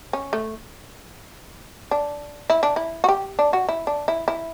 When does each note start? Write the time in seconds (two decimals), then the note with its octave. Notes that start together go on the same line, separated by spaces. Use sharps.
0.13 C#4
0.33 A3
1.91 D4
2.50 E4
2.63 D4
2.76 E4
3.04 F#4
3.09 G4
3.39 D4
3.53 F#4
3.69 E4
3.87 D4
4.08 E4
4.28 E4